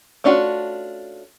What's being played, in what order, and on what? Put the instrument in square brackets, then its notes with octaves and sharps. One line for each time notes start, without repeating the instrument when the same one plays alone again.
[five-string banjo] A3 C#4 D4 F4 F#4